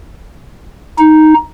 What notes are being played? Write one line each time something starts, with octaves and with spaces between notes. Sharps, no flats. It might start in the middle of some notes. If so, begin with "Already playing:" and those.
D#4